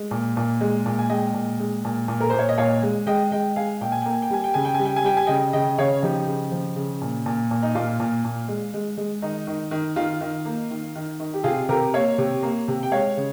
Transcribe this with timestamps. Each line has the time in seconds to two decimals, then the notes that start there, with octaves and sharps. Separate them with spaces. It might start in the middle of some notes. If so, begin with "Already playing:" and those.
Already playing: G#3
0.11 A#2
0.37 A#2
0.61 G#3
0.86 A#2
0.99 G#5
1.10 G#3 D#5 G5
1.34 A#2
1.60 G#3
1.85 A#2
2.08 A#2
2.20 A#4
2.30 A#2 C5
2.39 C#5
2.49 D#5
2.58 A#2 C#5 F5
2.83 G#3
3.07 G#3 D#5 G5
3.32 G#3 D#5 G5
3.56 G#3 F5 G#5
3.81 A#2 G5
3.92 G#5
4.02 A#3 G5
4.13 G#5
4.22 G5
4.30 G3 G#5
4.44 G5
4.54 C#3 G#5
4.65 G5
4.74 G#5
4.80 G3
4.85 G5
4.96 G#5
5.04 G3 G5
5.17 G#5
5.27 C#3 D#5 G5
5.53 C#3 D#5 G5
5.78 C#3 C#5 F5
6.02 F3 D#4 G4
6.27 C#3
6.52 F3
6.76 C#3
7.01 A#2
7.26 A#2
7.51 A#2
7.63 D#4
7.75 A#2 F4
8.00 A#2
8.24 A#2
8.48 G#3
8.74 G#3
8.97 G#3
9.22 D#3 D#4
9.47 D#3
9.71 D#3
9.96 D#3 F4
10.21 D#3
10.45 A#3
10.71 D#3
10.96 D#3
11.20 D#3
11.34 G4
11.44 C3 F4 G#4
11.69 C3 G4 A#4
11.94 A#3 C#5 F5
12.18 C3
12.43 A#3
12.68 C3
12.83 G5
12.92 G#3 C#5 F5
13.17 C#3